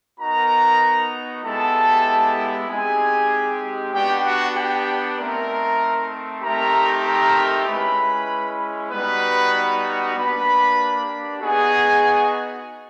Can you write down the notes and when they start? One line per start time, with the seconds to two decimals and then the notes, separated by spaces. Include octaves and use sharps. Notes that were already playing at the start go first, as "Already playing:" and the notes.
0.19 B3 D#4 F#4 A#4 A#5
1.44 G#3 B3 E4 G4 A4 A5
2.68 G#3 C4 D#4 G4 G#4 G#5
3.93 B3 D4 F#4 G4 G5
4.25 F#4 F#5
4.55 G4 G5
5.17 A3 C4 D#4 A#4 A#5
6.42 A3 C4 D#4 G4 A#4 A#5
7.05 A#4 A#5
7.66 G#3 C#4 E4 B4 B5
8.91 G3 B3 D#4 F#4 B4 B5
10.16 A#3 D4 G4 B4 B5
11.41 B3 D#4 F#4 G#4 G#5